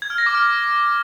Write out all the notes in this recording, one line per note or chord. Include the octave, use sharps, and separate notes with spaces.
G#6
F6
A#6
D6
F6